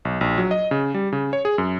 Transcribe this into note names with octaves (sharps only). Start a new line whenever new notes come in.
B1
A#1
F#3
D#5
C#3
G3
C#3
C#5
G#4
F#2